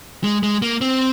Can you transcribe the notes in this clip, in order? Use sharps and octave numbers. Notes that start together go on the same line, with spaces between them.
G#3
G#3
A#3
C4